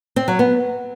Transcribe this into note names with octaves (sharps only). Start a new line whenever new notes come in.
C4
F#3
B3